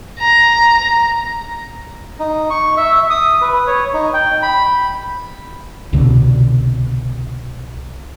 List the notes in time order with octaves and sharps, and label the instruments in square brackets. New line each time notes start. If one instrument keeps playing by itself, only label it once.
[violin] A#5
[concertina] D#4
C#6
E5
D#6
B4
C#5
D#4
G5
B5
[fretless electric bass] C2 B2 D3